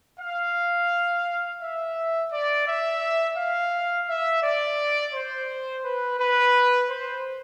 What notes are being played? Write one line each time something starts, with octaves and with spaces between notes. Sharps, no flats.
F5
E5
D5
E5
F5
E5
D5
C5
B4
B4
C5